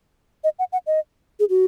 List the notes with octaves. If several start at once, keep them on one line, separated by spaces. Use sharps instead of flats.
D#5
F#5
F#5
D#5
G#4
F#4